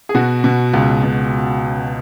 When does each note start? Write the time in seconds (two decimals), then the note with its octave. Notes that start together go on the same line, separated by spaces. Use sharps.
0.09 G#4
0.15 B2 F#4
0.44 B2
0.74 C#2
1.03 B2